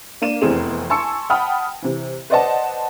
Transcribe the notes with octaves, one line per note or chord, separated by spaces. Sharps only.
A#3 D4 D#7 E7
F1 E2 C4 E4 G#4 E7
G#5 A5 C6 C#6 E6 C#7
F#5 G5 A5 B5 D#6 F6
C3 E3
B4 C5 D5 D#5 F#5 A5